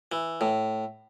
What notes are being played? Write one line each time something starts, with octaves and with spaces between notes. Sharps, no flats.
E3
A2